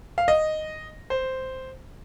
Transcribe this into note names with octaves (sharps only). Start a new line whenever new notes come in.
F5
D#5
C5